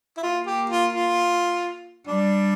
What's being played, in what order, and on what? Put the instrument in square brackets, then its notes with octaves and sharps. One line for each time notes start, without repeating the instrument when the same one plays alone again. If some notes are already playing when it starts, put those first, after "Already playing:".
[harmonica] E4
[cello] A#3 [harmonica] F4
[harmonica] G4
F4
F4
[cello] G3 [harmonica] D4